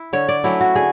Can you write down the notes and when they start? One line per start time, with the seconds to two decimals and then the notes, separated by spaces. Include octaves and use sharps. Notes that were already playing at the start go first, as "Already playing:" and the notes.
Already playing: E4
0.13 D3 C#5
0.29 D5
0.44 F#3 A3 C#4 E4
0.61 F#4
0.75 D3 G#4